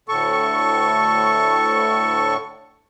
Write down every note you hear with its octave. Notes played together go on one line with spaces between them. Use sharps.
D2 A2 A4 C#6